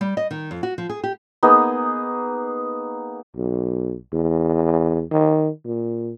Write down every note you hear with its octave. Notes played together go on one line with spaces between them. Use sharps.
G3
D#5
D#3
F2
F#4
F3
G#4
G4
A#3 B3 D#4 G#4
B1
E2
D#3
A#2